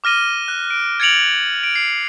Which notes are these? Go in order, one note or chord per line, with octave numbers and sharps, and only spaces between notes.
D6 F6 A#6 D#7 G7
F#6
D7
G#6 A6 C#7 D7 F7 F#7
D7
C7